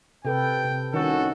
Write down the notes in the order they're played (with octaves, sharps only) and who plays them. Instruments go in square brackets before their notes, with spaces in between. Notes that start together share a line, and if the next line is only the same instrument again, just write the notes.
[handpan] C3 A4 B4 [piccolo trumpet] G5
[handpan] C3
[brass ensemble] C2 C#4 F#4 [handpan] D#3 [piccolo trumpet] A4